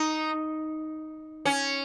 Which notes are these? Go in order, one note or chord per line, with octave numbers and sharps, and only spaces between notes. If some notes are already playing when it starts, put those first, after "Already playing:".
Already playing: D#4
C#4